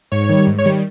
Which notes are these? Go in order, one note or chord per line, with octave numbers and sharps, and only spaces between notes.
G#2 C#5
D#3 G3
G#2
C#5
D#3 G3